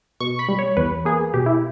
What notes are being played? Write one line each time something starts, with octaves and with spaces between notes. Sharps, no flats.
B2 C#6
B5
G3
C#5
E2 B4
A#3 G#4
B2 G4
E4